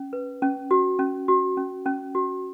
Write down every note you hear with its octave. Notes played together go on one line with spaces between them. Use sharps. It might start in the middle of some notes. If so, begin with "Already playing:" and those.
Already playing: C#4
B4
C#4
F#4
C#4
F#4
C#4
C#4
F#4